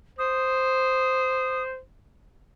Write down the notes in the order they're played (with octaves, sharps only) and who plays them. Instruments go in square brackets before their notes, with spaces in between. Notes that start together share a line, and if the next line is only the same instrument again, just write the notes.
[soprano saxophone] C5 [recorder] D#6